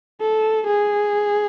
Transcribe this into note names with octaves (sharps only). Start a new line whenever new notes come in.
A4
G#4